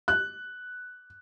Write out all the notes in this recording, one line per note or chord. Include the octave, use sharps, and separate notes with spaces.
F#6